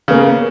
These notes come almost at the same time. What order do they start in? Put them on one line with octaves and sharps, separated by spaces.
C#3 B3 A#3